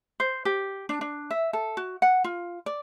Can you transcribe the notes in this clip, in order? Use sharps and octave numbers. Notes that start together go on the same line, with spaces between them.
C5
G4
D4
D4
E5
A4
F#4
F#5
F4
D5